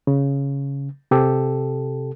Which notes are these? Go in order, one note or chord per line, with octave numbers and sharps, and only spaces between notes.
C#3
C3 G4 A4